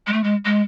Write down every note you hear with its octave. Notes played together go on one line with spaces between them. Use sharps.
G#3
A3
G#3
G#3